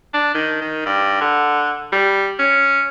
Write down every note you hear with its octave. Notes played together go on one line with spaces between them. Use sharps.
D4
D#3
D#3
G2
D3
G3
C#4